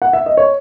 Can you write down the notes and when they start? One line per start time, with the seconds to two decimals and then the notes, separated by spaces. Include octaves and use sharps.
0.02 F#5
0.13 E5
0.26 D#5
0.37 C#5